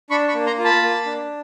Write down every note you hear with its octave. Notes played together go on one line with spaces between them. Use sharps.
D4 B5 C#6
B5 C#6
A#3
A#5 C6
F4
A5 B5
A#3
D4